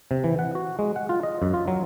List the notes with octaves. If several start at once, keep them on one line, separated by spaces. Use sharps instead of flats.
C3
E3
F#5
F#4
G#3
F#5
F4
D#5
F#2
F4
F#3